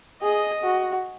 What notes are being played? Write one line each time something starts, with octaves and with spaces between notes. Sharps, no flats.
G#4 D#5
F#4